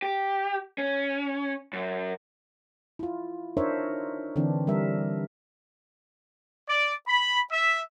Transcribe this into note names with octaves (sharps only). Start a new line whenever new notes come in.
G4
C#4
F#2
E4 F4
D4 D#4 A#4 C5 C#5 E5
D3 E3 C4 D4
G3 A#4 E5
D5
B5
E5